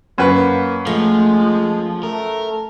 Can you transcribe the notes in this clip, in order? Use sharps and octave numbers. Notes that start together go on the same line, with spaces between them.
F#2 A#3 B4
F3 G#3 A3
A3 A#4